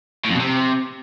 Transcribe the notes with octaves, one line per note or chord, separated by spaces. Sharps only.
A2
F2
B2
C3